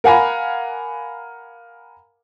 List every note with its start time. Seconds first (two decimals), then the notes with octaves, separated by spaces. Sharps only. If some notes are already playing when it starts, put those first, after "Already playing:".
0.04 A#4 F5 F#5 G#5 A#5 B5